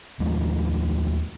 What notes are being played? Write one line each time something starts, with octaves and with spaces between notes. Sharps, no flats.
D#2 F3 G#3 A3